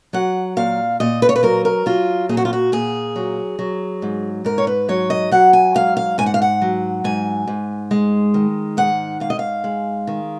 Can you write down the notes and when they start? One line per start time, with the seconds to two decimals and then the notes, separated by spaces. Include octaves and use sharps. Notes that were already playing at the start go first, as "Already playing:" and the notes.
0.13 F#3 F#5
0.57 A#2 F5
1.00 A#2 D#5
1.22 B4
1.29 C#5
1.36 B4
1.43 F#3 A#4
1.65 A#4
1.86 F#3 F4
2.29 A#2 G#4
2.37 F#4
2.45 F4
2.53 F#4
2.72 A#2 G#4
3.16 F#3
3.59 F#3
4.02 G#2
4.45 G#2 A#4
4.58 C#5
4.67 B4
4.89 F#3 C#5
5.10 D#5
5.31 F#3 F#5
5.53 G#5
5.74 G#2 F5
5.97 F5
6.18 G#2 G#5
6.26 F#5
6.34 F5
6.42 F#5
6.62 F#3
7.04 G#2 G#5
7.47 G#2
7.91 G#3
8.34 D#3
8.77 G#2 F#5
9.20 G#2 F5
9.30 D#5
9.39 F5
9.64 G#3
10.07 D#3